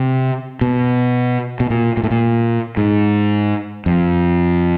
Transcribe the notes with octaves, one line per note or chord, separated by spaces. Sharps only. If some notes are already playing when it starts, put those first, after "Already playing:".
Already playing: C3
B2
B2
A#2
A#2
A2
A#2
G#2
F2